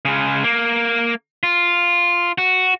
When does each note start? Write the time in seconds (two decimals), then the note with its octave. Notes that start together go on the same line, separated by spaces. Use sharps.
0.05 C#3 G#3
0.44 A#3
1.43 F4
2.38 F#4